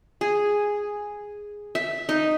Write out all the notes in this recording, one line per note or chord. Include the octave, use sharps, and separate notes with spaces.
G#4
E5
D#4